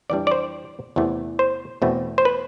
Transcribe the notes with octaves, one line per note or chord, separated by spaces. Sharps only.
F2 E3 G3 D4 D5
D5
C5
E2 C3 E3 A3
C5
E2 B2 A3 C4
C5
B4